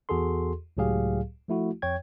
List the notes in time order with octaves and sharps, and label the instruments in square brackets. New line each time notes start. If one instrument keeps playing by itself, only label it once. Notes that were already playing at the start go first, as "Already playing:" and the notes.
[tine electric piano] E2 F#4 G#4 A4 C6
C#2 A2 F#3 G4 G#4 F5
F3 A3 E4 F#4
F2 C#5 G5 G#6